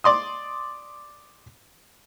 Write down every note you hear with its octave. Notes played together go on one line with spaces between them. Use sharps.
D5 C6 D#6